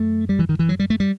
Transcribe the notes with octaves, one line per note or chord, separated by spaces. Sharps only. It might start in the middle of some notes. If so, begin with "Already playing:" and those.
Already playing: F#2 A3
G3
E3
D#3
E3
F#3
G3
A3
G3